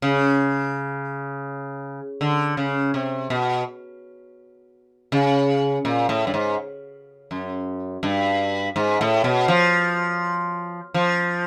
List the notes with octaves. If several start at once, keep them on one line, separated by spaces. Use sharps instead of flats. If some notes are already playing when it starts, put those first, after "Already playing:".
C#3
D3
C#3
C3
B2
C#3
A#2
A2
G2
G#2
F#2
G2
G#2
A2
B2
F3
F3